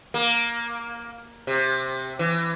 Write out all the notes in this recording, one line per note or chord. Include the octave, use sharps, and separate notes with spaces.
A#3
C3
E3